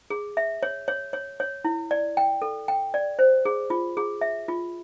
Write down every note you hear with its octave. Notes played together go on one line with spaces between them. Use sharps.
G#4
E5
C#5
C#5
C#5
C#5
E4
D5
G5
A4
G5
D5
C5
G#4
F4
G#4
E5
F4